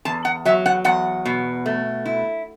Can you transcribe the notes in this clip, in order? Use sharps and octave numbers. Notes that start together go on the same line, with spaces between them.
E2 A5
F#5
F#3 E5
F#5
E2 F#5
B2
A3
E4